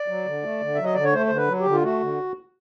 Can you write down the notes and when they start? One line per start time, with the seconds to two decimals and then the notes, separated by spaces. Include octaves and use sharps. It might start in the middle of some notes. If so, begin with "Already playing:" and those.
Already playing: D5
0.08 F#3
0.26 D3
0.43 A3
0.60 D3
0.75 F#3 E5
0.84 D#5
0.94 D3 D5
1.04 C#5
1.13 A3 C5
1.26 D3 C5
1.36 B4
1.48 F#3
1.60 G4
1.66 D3
1.72 F4
1.83 A3 F#4
2.01 D3